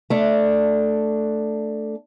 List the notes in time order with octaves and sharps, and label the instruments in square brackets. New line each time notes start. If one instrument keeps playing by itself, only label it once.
[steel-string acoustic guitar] A3 D4